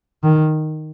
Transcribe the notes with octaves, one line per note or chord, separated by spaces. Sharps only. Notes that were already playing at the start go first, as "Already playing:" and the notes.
D#3